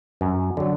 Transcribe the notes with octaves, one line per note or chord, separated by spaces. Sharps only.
F#2
D3 F#3